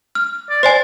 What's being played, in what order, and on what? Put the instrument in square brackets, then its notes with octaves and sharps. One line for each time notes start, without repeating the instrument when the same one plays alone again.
[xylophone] F6
[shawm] D5
[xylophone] C5 D5 G#5 [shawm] C6